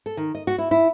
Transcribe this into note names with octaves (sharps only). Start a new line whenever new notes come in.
A4
D#3
D#5
F#4
E4
E4